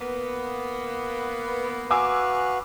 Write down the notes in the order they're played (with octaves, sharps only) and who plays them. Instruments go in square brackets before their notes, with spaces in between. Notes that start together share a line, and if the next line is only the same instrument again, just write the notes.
[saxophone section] A#3 B3
[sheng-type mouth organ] F#4 B4 F5 [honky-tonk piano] G#5 D6 E6